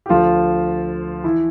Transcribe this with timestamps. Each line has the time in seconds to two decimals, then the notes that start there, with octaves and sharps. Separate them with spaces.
0.06 G4
0.09 D2 D3 F3 F4
1.23 E3 E4